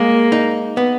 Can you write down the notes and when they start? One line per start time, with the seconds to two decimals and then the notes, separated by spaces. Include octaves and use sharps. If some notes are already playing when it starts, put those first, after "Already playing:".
Already playing: G#3 A#3
0.32 D#4
0.77 B3